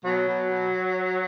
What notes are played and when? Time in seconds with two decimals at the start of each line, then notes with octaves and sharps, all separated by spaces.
0.05 B2 F#3
0.28 B2
0.50 B2